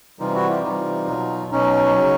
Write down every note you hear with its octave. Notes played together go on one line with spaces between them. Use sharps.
C3 E3 G3 D#4 F4
E4 F#4
F4 G4
C3 E3 G3 D#4 F4
B2 F#3
B2 F#3 C#4 D#4
C#3 F#3